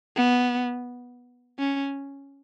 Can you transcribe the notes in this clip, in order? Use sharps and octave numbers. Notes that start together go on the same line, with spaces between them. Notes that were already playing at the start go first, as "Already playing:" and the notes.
B3
C#4